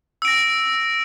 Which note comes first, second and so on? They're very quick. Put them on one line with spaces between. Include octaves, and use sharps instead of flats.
E6 D7 A#6